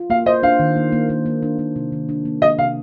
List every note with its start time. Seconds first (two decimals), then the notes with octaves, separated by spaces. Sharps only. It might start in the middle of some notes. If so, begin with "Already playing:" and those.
Already playing: F4
0.10 A#3 F5
0.26 C5 D#5
0.43 D4 F5
0.60 D#3
0.76 A#3
0.92 A#3
1.09 A#3
1.26 A#3
1.43 D4
1.59 A#3
1.76 C3
1.92 D#3
2.09 D4
2.25 A#3
2.42 A#3 D#5
2.59 C3 F5